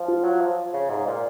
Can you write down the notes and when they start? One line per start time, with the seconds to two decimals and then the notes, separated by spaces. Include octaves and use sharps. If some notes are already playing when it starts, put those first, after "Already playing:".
Already playing: F3
0.08 F4
0.24 F#3
0.41 F3
0.73 C#3
0.90 G#2
1.06 A#2